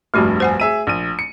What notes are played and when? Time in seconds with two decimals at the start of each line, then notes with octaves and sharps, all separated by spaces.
0.14 F1 A#1 G2 A3 F#4 G4
0.40 C5 F#5 G#5
0.60 G#4 E5 D#7
0.87 A#1 D#7
1.19 C#7